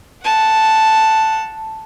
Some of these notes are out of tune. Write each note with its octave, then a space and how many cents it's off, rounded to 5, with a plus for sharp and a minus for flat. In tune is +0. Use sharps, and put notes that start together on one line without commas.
F#5 -5 A5 +0